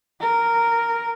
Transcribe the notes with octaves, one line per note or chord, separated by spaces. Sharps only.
A#4